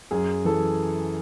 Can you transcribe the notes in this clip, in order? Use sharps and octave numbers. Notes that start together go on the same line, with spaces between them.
F#2 G#4
E3 A4